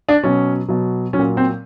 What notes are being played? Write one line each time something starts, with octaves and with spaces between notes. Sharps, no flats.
D4
B2 F#3 C#4
B2 F#3
F#3 C#4
A#2
C4